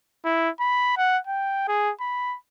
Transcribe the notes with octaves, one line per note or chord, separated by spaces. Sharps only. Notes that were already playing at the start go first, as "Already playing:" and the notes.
E4
B5
F#5
G5
G#4
B5